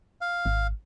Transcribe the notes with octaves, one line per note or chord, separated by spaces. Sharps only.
F5
G#1